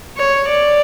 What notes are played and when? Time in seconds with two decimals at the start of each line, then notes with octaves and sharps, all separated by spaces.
0.17 C#5
0.48 D5